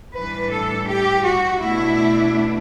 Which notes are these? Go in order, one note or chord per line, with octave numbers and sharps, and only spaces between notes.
A2 E3 G3 D4 B4
A4
G4
F#4
B2 A3 D4 E4